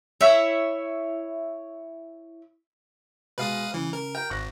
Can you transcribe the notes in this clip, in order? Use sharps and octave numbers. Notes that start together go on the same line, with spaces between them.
E4 C#5 E5
B2 G#3 B4 F5 D#6
C#3 E3
A#4
A#4 G5
G#1 C#6 F#6 A#6